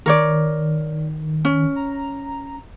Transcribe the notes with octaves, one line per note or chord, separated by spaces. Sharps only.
D#3 A#4 C#5 D5
C#4
A#5